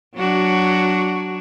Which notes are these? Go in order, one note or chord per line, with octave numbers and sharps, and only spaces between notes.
F#3 D4 F#4